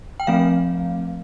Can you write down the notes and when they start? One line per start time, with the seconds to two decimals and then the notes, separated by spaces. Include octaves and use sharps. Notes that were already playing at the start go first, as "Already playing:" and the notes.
0.20 G5
0.27 F3 A3 C4 F5